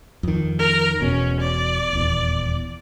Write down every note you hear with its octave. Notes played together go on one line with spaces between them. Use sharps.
F2 D#3
A#4
E1 E2 B2 C#4
D5
D#1 E2